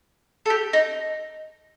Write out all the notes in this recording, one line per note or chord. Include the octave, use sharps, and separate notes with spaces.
A4
G4
D#4